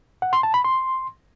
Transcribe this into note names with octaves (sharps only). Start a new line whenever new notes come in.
F#5
C6
A5
B5
C6